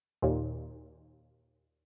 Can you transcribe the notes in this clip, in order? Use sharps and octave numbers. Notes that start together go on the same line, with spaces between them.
D#2 A#2